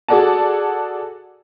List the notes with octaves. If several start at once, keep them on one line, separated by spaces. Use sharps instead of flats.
F#4 G#4 A4 D5 F#5 A5